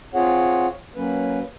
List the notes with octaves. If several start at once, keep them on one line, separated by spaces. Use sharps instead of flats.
C4 F4 G#4 C#5 F#5
F#3 A#3 C#4 B4